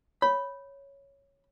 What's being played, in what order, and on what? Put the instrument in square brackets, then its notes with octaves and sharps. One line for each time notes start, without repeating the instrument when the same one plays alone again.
[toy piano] C#5 [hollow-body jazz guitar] B5